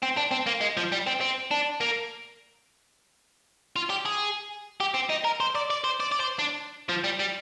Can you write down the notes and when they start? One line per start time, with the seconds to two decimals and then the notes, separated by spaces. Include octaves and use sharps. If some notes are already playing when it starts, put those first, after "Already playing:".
0.02 C4
0.17 D4
0.31 C4
0.47 A#3
0.61 G#3
0.77 F3
0.92 G3
1.07 C4
1.21 C4
1.51 D4
1.81 A#3
3.76 F4
3.90 G4
4.05 G#4
4.80 G4
4.94 C4
5.10 D#4
5.25 A#4
5.40 C5
5.55 D5
5.70 D5
5.84 C5
6.00 D5
6.12 D5
6.20 C5
6.39 D4
6.89 F3
7.04 G3
7.20 G3